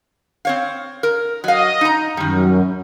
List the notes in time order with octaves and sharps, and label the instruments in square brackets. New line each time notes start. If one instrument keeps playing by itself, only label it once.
[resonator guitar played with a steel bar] C4 C#5 F5
A#4
[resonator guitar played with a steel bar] F#3 F5 [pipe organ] D#5
[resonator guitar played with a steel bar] D#4 A#5
[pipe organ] F#2 [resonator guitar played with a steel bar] D#3 G3